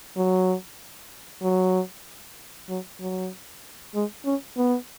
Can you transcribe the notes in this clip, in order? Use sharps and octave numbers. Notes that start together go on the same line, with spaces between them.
F#3
F#3
F#3
F#3
G#3
C#4
B3